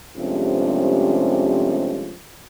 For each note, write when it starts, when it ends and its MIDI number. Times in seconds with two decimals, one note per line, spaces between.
0.16 2.15 43
0.16 2.15 48
0.16 2.15 53
0.16 2.15 56
0.16 2.15 57
0.16 2.15 61